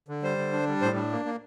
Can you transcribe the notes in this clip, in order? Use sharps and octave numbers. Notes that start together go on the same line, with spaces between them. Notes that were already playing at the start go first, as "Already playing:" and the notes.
D3
G3 C5
D3
D4
G3
A2 C5
D4
A#3
A#3